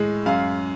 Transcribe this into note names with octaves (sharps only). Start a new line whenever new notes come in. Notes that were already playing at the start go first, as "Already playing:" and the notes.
Already playing: A2 G#3
F#2 F5